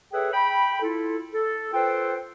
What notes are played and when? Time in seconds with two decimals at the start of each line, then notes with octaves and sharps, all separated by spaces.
0.13 G#4 A4 B4 C#5 E5 G5
0.33 G5 B5
0.82 E4 F4 A4
1.34 A4
1.73 F4 A4 B4 C5 G5